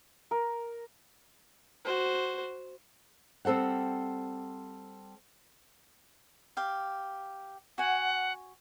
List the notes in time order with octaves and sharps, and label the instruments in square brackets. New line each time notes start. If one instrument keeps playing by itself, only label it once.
[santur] A#4
[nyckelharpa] F#4 C5
[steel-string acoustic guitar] G3 C4 A4 C5 F#5
[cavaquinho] G4 F5
[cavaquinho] F#4 G#5 [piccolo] F#5